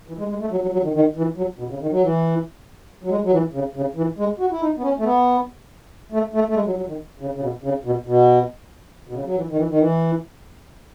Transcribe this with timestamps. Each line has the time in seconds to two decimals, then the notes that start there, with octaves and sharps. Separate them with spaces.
0.08 E3
0.19 G#3
0.29 G#3
0.41 A3
0.51 F#3
0.62 F#3
0.73 F#3
0.83 D#3
0.94 D#3
1.16 E3
1.37 F#3
1.59 B2
1.70 C#3
1.81 D#3
1.91 F#3
2.02 E3
3.03 F#3
3.10 G#3
3.24 F#3
3.32 E3
3.53 C#3
3.75 C#3
3.96 E3
4.18 G#3
4.39 F#4
4.52 E4
4.61 D#4
4.77 B3
4.83 C#4
4.99 A3
5.04 B3
6.12 A3
6.33 A3
6.48 A3
6.55 G#3
6.66 F#3
6.77 F#3
6.88 D#3
7.20 C#3
7.35 C#3
7.42 B2
7.63 C#3
7.85 B2
8.06 B2
9.09 B2
9.14 C#3
9.25 F#3
9.36 E3
9.49 D#3
9.57 E3
9.70 D#3
9.79 E3